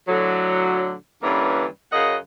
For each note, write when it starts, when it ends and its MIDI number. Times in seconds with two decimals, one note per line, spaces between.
0.08 0.93 45
0.08 0.93 50
0.08 0.93 54
1.23 1.65 43
1.23 1.65 50
1.23 1.65 52
1.23 1.65 58
1.23 1.65 61
1.92 2.15 42
1.92 2.15 49
1.92 2.15 75
1.92 2.15 78